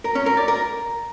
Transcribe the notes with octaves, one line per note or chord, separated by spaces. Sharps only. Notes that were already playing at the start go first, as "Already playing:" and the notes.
A#4
C#4
A#4
D5
A#4